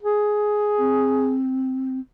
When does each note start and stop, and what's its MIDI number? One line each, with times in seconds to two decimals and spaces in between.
0.03 1.34 68
0.78 1.99 60